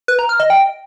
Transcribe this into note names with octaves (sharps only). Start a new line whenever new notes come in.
B4
A#5
F6
D#5
G5